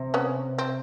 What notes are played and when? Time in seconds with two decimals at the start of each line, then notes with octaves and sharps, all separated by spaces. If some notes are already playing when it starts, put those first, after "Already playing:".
Already playing: C3
0.14 B3 C#4
0.58 C4